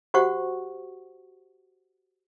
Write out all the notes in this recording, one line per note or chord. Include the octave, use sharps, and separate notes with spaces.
F#4 G4 C5 F#5 C#6